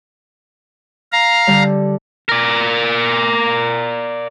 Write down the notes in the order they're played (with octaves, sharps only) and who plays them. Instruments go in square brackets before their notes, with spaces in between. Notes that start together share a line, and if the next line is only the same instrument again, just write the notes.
[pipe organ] F5 A#5
[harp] D3 G3
[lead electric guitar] A#4 D5